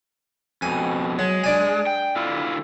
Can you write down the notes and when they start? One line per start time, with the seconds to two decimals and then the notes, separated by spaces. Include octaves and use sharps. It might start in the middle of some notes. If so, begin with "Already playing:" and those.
0.62 F2 B2 G#5
1.19 F#3 G#3
1.44 D4 D5 G#5
1.87 G5
2.16 D3 E4 F4